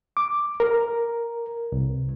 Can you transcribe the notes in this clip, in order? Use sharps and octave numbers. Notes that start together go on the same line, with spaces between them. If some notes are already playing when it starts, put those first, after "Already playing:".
D6
A#4
C2